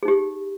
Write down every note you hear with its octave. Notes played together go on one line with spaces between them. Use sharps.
D#4 G4 G#4